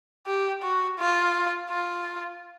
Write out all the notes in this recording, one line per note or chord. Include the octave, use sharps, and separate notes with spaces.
G4
F#4
F4
F4